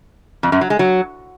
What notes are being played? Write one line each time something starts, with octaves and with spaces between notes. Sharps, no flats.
F2
F#2
F#3
G#3
F#3